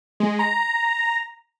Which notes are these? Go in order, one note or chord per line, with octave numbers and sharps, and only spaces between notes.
G#3
A#5